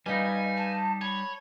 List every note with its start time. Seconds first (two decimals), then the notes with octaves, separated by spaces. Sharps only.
0.06 G3 D#4 B4 D#5 F5 G#5
0.57 A5
1.01 C#5 A5 B5